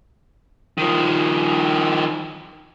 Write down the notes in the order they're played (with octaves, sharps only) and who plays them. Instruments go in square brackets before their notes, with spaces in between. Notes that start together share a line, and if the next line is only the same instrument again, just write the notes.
[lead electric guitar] D#3 F3